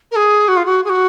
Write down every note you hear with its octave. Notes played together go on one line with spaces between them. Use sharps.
A#4
G#4
F#4
F4
F#4
G#4
F#4